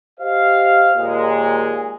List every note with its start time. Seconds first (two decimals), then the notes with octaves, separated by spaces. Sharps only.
0.20 G4 C5 D#5 F5
0.96 D#2 A#2 G#3